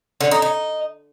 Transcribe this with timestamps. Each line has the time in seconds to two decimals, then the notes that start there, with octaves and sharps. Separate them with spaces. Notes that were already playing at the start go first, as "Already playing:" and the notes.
0.21 D3
0.31 D#4
0.42 D#4